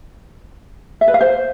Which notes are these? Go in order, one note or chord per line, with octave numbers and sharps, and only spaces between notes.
E5
B4
F5
C5